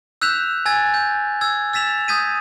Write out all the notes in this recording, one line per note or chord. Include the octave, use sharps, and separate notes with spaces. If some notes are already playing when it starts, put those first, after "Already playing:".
E6 F#6 G6 B6 E7 F7
G#5 E6 G#6 A6
G6
E6 G#6
E6 A6 B6 E7 F7
D#6 G6 G#6 B6 D#7